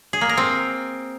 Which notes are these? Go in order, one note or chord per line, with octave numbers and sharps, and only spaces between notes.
G#4
A#3
A#4
C4